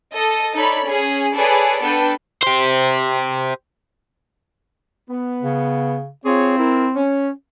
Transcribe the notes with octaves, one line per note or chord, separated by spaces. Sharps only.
A4 D#5 A5
D#4 A4 C#5 D5 B5
C#4 G#4
G#4 A4 B4 C#5 D5 B5
B3 D4 A4 B4 G5
G4 C5
B3
C#3
C4 F4 G#4 C#5
E4 A#4
C#4